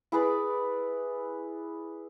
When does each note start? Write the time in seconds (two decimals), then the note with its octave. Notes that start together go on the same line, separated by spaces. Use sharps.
0.12 E4 G#4 B4 D5